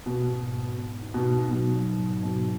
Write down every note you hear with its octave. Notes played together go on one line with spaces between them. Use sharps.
B2 B3
G#2
G#2
B3
D#4
B2
D#4
B2 F#3
F#3
G#2
G#2 B2